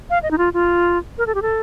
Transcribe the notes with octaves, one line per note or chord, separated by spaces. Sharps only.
F5
D#5
D#4
F4
F4
A#4
A4
G4
A4